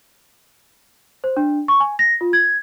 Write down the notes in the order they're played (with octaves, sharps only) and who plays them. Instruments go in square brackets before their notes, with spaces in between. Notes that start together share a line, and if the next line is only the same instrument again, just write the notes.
[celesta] C5
D4
C#6
G#5
A#6
F4
G#6